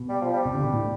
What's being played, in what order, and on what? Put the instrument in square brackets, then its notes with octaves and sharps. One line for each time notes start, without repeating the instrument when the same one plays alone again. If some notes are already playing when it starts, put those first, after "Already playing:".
Already playing: [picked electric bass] B2
[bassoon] G3
F3
G3
[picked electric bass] C3
D3
B2
A2